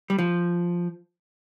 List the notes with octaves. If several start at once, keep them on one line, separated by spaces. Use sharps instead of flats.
G3
F3